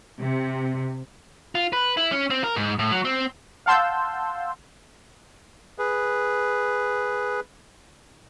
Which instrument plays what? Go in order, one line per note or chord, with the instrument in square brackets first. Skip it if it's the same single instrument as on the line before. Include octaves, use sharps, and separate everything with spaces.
[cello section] C3
[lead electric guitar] F4
B4
E4
C#4
C4
A#4
G#2
A2
F#3
C4
[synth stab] F5 F#5 A5 C6 E6 G6
[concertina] G#4 B4